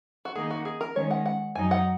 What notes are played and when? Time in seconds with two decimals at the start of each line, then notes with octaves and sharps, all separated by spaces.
0.25 F#4
0.35 D#3 A#3 D#4 G#4
0.51 F#4
0.65 G#4
0.81 A#4
0.96 D#3 G#3 C#4 C#5
1.11 F#5
1.26 F#5
1.55 F#2 F#3 D#4 G#5
1.71 F#5